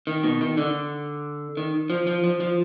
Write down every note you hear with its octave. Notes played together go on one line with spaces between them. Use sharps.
D#3
B2
D#3
D3
D#3
F3
F3
F3
F3